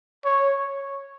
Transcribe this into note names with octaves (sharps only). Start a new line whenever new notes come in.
C#5